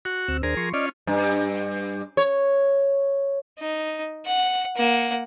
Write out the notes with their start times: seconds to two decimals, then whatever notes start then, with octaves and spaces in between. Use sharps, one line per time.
0.05 F#4
0.28 D2 C4 E6
0.43 D#2 D4 G#4 A#4 C5
0.57 F3 C6 C#6
0.74 C#4 F4 D5 D#5 D6
1.07 G2
2.17 C#5
3.59 D#4
4.26 F#5
4.77 A#3 F#5